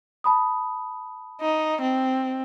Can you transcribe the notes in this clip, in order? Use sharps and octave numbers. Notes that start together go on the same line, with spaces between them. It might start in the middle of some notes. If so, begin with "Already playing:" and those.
A5 B5 D#6
D#4
C4